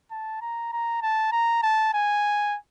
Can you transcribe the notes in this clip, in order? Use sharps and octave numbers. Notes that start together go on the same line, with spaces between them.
A5
A#5
A#5
A5
A#5
A5
G#5